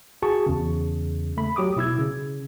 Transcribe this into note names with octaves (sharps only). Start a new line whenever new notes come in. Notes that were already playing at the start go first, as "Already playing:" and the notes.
F#4 G#4 A5 C#6
E2 C#3
A3 B5
F#3 G4 D6 D#6
B2 E4 E6 G#6
C#3